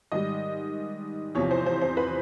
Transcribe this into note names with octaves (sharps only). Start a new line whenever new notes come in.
G#2 D#3 G3 D#5
E2 C3 F3 C#5
C5
C5
C5
B4